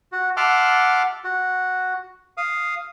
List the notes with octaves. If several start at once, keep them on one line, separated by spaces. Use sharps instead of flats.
F#4
E5 F#5 A5 C6 D6 F6
F#4
F5 D#6